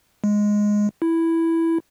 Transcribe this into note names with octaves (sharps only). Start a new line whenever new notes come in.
G#3
E4